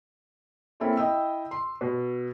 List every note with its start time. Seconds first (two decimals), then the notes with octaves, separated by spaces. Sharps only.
0.80 A#3 C4 C#4 E4 A4 A#4
0.97 E4 D#5 G5 E6
1.51 C6
1.81 B2